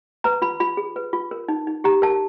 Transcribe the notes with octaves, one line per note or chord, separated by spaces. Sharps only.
B4 A#5
F4 B5
F4 B5
G#4
B4
F4
A#4
D#4
D#4
G4 A#5
A#4 A5